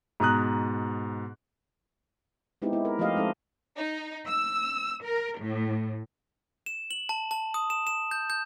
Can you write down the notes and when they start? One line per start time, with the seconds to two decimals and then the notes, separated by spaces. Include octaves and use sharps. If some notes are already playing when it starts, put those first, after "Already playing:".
0.20 G#2 B2 A#5 D#6 F#6
2.62 G#3 B3 C4 D#4 E4 G4
2.73 E4
2.85 A#4
2.99 F3 A3 F4 G4 D#5 F5
3.16 G#3 C4 D#4 A4
3.76 D#4
4.27 E6
5.05 A#4
5.41 A2
6.66 E7
6.91 F#7
7.09 A5
7.31 A5
7.54 D#6
7.70 E7
7.87 E7
8.11 G6
8.30 G6